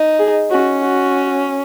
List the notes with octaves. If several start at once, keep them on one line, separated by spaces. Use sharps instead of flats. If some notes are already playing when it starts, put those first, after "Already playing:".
Already playing: D#4
G#4
C#4 F#4
F#4